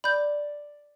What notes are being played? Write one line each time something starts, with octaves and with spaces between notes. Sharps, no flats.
D5 B5 G6